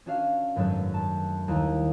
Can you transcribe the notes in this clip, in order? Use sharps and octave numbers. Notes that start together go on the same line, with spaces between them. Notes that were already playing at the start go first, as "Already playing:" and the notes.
C#4 D4 F#4 E5 F5
G#1 F#2 F#3 G#3 A3 A4
A5
D#2 G3 E4